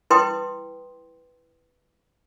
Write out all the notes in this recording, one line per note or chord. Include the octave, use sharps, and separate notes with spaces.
E4 B4 G5 C6 D#6